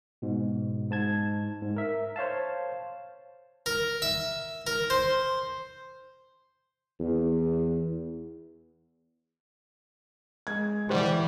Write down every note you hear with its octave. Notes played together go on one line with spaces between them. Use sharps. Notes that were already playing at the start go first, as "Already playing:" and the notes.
G#2 B2
G#2 A5 G#6
G#2
A#4 E5
C5 C#5 F5 A5
A#4
E5
A#4
C5
E2
G#3 G#6
E3 G3 G4 C5 F#5